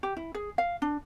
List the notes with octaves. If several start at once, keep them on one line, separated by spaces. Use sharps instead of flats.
G4
E4
G#4
F5
D4